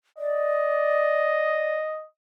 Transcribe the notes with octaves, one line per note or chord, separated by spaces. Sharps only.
D5 D#5